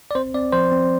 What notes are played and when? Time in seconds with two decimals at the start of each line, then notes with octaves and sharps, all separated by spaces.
0.11 D5
0.15 C4 C5
0.34 C4 D5
0.52 F3 C5
0.72 C4